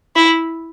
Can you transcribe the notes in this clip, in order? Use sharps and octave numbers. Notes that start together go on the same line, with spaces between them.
E4